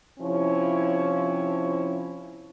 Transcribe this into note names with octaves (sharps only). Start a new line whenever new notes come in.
C3 F3 C#4 E4 C#5